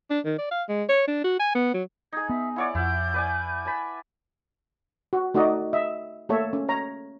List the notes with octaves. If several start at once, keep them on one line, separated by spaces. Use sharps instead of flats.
D4
D#3
D5
F5
G#3
C#5
D4
F#4
G#5
B3
F#3
D#4 G#4 G#6
B3 E5
E4 C#5 D5 F#5
F2 E4 F#5 G6
B4 D5 G#5
G#5 A5 B5
F#4
A3 D#4 F#4 D5 D#5
D#5 E5
A3 A#3 A4 C#5 E5
C#4
C#5 A#5